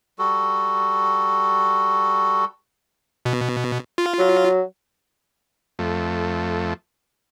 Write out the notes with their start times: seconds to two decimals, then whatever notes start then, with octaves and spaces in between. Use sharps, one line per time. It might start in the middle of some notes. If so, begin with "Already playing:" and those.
0.19 G3 F#4 A4
3.25 B2
3.98 F4
4.19 F#3
5.79 F2 A3